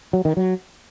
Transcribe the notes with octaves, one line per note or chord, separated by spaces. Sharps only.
F#3
D#3
F#3